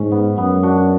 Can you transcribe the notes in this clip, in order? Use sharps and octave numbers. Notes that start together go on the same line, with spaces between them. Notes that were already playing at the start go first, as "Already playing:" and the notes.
Already playing: G#2 C#4
B3
F#2 B3
D4 F#4